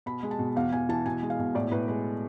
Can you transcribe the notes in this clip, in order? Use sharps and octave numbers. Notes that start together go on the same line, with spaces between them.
B2 B5
G#3
A5
B2
E2 F5
E2 G#5
E3 A5
B2 G#5
G#3
F5
B2
A2 D5
A2 B4
G#3 B4